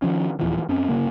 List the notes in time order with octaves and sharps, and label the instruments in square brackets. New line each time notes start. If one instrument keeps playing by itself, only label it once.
[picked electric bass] D#3 F3 C#4
D#1 E2 E3 F3
F#2 C4 C#4
G1 C#3 A#3